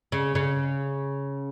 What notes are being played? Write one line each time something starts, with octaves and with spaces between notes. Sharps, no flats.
C#3
C#3